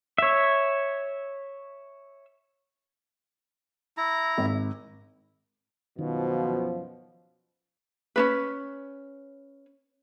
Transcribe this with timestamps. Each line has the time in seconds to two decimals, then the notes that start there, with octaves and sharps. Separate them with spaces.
0.18 C#5 E5
3.97 E4 A#5
4.38 G#1
5.99 F#2 B2 D#3 F3
8.16 C#4 D4 B4